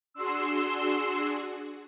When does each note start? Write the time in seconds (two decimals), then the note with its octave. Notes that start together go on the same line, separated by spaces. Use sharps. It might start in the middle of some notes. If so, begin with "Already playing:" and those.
0.14 D4 F#4 G#4 C6 E6